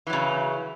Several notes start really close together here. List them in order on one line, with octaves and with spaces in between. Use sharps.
E3 F#3 C#3